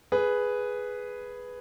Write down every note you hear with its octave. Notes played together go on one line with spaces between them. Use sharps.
G#4 B4